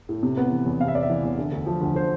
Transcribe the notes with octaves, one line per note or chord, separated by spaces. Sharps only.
A2
C3
B3
E3
E2
C3 F5
E5
B3 D5
E5
E3
E2
D3
D2
F3
D2
D3 C5